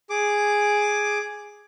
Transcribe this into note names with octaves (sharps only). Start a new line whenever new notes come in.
G#4 D6